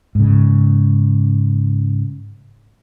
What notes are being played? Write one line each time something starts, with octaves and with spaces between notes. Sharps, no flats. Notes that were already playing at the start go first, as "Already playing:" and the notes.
G#2 C#3